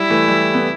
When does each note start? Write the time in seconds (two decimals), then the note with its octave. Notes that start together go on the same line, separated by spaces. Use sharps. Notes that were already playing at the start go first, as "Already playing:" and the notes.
Already playing: G3 E4
0.10 E3 A3
0.28 G3
0.54 B3